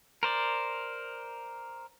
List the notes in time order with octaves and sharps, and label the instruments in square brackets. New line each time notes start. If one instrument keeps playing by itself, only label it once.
[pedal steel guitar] A#4 C5 D5